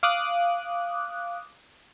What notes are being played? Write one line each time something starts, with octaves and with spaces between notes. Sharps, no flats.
F5 D6 D#6 F#6